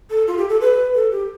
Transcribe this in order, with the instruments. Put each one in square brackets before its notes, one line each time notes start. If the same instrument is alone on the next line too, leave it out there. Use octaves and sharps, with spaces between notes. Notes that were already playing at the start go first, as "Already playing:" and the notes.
[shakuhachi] A4
F4
G4
A4
B4
A4
G4